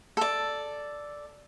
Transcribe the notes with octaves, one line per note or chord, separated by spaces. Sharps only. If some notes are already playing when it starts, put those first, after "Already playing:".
A4 D5